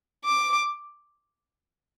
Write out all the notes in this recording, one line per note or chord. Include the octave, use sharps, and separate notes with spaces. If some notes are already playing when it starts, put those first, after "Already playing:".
D6